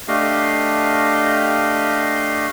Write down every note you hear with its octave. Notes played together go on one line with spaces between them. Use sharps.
A3 D4 G4 D#5 F5